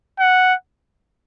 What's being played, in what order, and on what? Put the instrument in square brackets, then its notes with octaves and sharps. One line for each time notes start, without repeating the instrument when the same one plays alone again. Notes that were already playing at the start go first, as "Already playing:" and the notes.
[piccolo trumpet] F#5